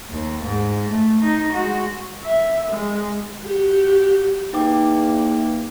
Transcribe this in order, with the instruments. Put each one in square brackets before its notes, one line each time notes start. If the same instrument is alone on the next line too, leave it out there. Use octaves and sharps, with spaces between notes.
[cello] D#2
G#2
A3
D#4
G#3 F#4
[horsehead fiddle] E5
G#3
[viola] F#4 G4
[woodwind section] E2 A#3 [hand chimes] D#4 G5 D6